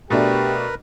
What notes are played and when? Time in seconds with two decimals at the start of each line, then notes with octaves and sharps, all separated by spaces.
0.10 B2 A3 D4 G4 A#4 B4